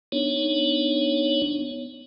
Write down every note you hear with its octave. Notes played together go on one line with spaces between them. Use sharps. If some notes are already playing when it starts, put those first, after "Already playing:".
B3 D4 D#4 C#5